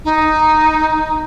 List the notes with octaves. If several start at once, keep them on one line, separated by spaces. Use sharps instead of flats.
D#4